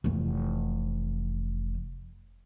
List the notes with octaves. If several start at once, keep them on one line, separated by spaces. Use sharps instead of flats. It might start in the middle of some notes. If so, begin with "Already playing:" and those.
F1 E3